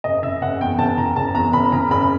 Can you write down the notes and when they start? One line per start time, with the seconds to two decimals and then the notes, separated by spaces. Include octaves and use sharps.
0.04 F#1 D#5
0.23 C#3 E5
0.42 F#1 F#5
0.61 E2 G5
0.79 F#1 A5
0.97 C#3 A#5
1.16 F#1 A5
1.34 E2 A#5
1.53 F#1 B5
1.72 C#3 A#5
1.91 F#1 B5